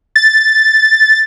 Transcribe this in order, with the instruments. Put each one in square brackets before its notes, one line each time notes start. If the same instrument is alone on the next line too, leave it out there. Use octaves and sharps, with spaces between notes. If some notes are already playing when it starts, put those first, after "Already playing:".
[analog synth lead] A6